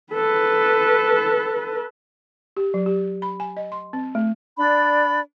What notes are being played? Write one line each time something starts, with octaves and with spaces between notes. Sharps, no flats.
A4 B4
G4
F#3
G4
B5
G#5
D#5
C6
C4
A3
D4 D5 B5